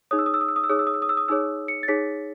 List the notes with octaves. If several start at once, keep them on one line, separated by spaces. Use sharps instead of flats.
D#4 G#4 C#5 D#6
E6
D#6
E6
D#6
E6
D#6
E6
D#4 G#4 C#5 D#6
E6
D#6
E6
D#6
E6
D#6
D#4 G#4 C#5 E6
C#7
A6
D#4 G#4 C#5 B6